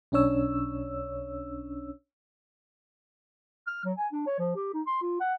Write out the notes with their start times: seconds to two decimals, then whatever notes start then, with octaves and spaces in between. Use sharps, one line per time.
0.12 B1 C#4 D4 C#5 E6
3.67 F6
3.85 F#3
3.98 G#5
4.12 D4
4.27 C#5
4.39 F3
4.56 G4
4.74 D#4
4.87 C6
5.02 F4
5.20 F#5